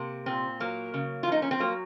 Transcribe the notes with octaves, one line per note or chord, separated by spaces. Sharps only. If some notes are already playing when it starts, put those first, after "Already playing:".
Already playing: C3 A#3
A#2 C4
F#3 A#3
C#3
F4
F3 D#4
C#4
C4
F#3 A#3